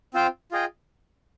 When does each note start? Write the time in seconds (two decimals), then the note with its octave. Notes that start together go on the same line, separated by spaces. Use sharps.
0.14 C4 F4 C5 G5
0.51 F4 G#4 D#5 G5